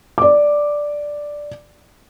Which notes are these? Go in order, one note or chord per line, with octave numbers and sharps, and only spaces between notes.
D5 D6